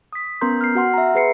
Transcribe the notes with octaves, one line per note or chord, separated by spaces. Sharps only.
D#6 B6
B3 C#4 A#4 A#5 C6 G6
F6 C7
F#4 F#5 C6 F6
E5 A#5
G#4 B4 C7 C#7